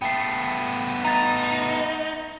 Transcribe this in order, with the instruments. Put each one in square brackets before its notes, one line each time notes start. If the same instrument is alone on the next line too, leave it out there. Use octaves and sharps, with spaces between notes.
[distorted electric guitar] A3 B3 [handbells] G5 C7
[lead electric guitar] D#4 [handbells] A#5 A6